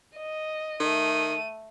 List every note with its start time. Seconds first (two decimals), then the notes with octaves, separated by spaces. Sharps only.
0.16 D#5
0.80 D#3 A3 D#7